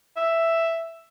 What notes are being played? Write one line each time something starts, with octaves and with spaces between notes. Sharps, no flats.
E5